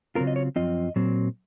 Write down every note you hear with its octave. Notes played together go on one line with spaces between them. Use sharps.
C#3 F#3 C4 F4 A#4
D#5
C#5
F#2 F3 C4 F4 D#5
A#2 F#3 C4